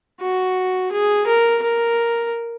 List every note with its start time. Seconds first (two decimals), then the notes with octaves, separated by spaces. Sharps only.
0.21 F#4
0.92 G#4
1.27 A#4
1.63 A#4